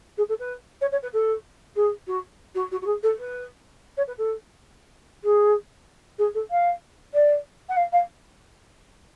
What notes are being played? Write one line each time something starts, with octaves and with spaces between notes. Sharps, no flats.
G#4
A4
B4
C#5
C#5
B4
A4
G#4
F#4
F#4
F#4
F#4
G#4
A4
B4
C#5
B4
A4
G#4
G#4
A4
F5
D5
F#5
F5
F5